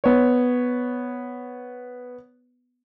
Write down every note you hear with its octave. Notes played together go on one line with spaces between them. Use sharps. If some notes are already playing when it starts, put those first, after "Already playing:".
B3 C#5